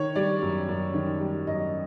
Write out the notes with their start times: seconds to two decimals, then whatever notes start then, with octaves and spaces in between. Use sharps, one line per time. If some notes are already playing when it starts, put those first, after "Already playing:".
Already playing: D#3 C#5
0.16 G3 D5
0.42 F#2
0.68 F#2
0.94 D#3
1.20 G3
1.47 F#2 D#5